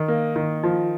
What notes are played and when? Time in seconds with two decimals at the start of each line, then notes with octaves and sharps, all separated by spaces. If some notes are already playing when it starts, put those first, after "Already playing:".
Already playing: D#3
0.08 A#3
0.36 D#3
0.63 F3